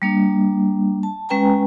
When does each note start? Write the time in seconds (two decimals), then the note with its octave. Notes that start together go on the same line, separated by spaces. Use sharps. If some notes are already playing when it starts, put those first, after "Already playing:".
0.02 G3 A#3 D4
1.03 A5
1.29 G#3 C#4 B4 G5 G#5 A#5